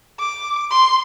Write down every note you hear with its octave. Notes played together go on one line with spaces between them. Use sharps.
D6
C6